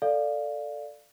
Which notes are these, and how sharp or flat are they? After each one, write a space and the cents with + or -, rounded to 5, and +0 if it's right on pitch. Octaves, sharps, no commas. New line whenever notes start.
A4 +10 D5 +0 F5 +0